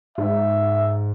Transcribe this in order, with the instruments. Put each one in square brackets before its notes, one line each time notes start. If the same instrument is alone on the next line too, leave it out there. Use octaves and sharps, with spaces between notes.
[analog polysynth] G#2 [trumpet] E5